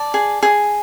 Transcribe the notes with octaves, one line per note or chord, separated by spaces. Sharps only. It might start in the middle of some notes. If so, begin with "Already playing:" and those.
Already playing: D5 A5
G#4
G#4